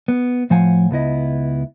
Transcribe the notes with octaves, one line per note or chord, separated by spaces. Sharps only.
B3
A2 F3 C5 F5 F#5 G#5
C#2 B3 E4 D#5